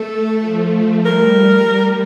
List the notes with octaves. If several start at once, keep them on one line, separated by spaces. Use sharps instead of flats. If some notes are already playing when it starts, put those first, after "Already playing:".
Already playing: A3 A4
F3
G3 A#4